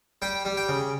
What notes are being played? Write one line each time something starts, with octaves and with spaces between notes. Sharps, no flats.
G3 G5
G3
G5
C#3